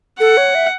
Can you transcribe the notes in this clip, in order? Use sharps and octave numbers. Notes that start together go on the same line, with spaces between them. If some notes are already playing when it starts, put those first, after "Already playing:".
A4 F#5
C#5
E5